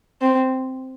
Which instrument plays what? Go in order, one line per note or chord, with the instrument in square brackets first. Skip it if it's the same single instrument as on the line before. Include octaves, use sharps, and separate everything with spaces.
[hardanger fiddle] C4